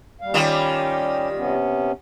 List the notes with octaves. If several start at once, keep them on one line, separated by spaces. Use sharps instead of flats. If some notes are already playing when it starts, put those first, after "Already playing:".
D#2 G3 F5
D#3 G3 C#4 F4 G4
C3 B3 C#4